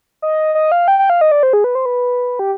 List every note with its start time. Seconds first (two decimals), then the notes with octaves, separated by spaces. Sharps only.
0.22 D#5
0.55 D#5
0.72 F5
0.88 G5
0.99 G5
1.10 F5
1.21 D#5
1.32 D5
1.43 C5
1.53 G#4
1.64 B4
1.75 C5
1.86 B4
2.39 G4